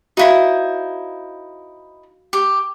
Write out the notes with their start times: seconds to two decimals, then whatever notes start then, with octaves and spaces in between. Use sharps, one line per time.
0.17 D#4 E4 F#4 C5 F5 B6
2.33 G4